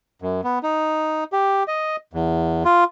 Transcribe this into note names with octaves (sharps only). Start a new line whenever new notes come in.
F#2
B3
D#4
G4
D#5
E2
F4